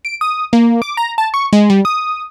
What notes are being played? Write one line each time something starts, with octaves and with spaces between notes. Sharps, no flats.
D7
D#6
A#3
D6
A#5
A5
C#6
G#3
G3
D#6